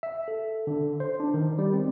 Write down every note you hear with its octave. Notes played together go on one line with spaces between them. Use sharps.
E5
A4
D3
C5
D4
D#3
G3
C4